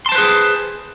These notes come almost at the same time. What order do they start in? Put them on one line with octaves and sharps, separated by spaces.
C6 A5 C5 B4 G#4